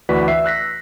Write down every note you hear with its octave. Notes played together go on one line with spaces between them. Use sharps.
D2 E3 F#4 B4 D5 B6
E5 C7
E6 F#6 A#6 B6